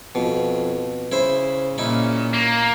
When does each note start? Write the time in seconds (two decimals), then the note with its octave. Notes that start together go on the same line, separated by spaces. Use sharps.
0.15 F2 B2
1.12 C#3 E4 C5
1.78 A#2 C#4 D#4 E4
2.34 A#3